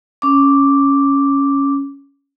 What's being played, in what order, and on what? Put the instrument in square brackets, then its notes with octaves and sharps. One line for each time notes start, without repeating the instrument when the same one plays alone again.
[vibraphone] C#4 D6